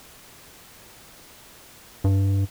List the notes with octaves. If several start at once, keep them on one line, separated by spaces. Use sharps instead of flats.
G2